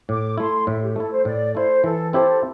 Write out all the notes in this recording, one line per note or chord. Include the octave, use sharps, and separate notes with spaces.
A2 D6
A3 E4 C6
A2 E5
G4
A3 E4 A4
C5
A2 D5
A3 E4 C5
E3 A4
C4 E4 G4 A4 C5